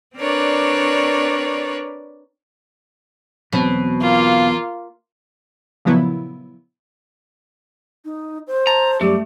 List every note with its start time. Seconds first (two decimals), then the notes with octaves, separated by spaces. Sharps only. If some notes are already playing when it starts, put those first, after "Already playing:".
0.17 C4 D4 A#4 B4 C#5 D5
3.53 E2 B2 F#3 C4
4.01 A#3 F4
5.85 A#2 C#3 F3 F#3 B3 E4
8.05 D#4
8.47 C5
8.67 A5 A#5
9.01 F#2 G3 A3 G4